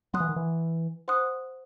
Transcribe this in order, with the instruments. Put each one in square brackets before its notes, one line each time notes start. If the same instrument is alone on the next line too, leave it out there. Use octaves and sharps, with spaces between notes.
[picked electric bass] F#3 [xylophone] F#5 C6 D#6 F#6
[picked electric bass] E3
D#3
E3
[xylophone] C5 F#5 C6 D#6 F#6